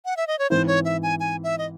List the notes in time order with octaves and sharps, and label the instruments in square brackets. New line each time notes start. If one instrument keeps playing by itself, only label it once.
[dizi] F#5
E5
D#5
C#5
[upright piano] G#2 E3 C4 E4 [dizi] C5
[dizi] C#5
E5
G#5
G#5
E5
D#5